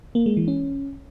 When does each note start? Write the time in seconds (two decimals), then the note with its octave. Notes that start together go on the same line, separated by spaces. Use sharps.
0.15 A#3
0.26 G#3
0.37 E3
0.48 C#4